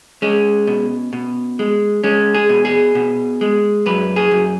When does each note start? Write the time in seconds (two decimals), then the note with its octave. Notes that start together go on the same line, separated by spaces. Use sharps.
0.22 G#3 C#4
0.67 B2
1.13 B2
1.59 G#3
2.04 G#3 C#4
2.34 G#4
2.49 B2
2.65 G#4
2.95 B2
3.41 G#3
3.86 F#2 B4
4.16 G#4
4.31 F#2